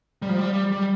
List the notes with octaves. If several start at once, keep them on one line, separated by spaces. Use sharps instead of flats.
G3
F3
G3
G3
G3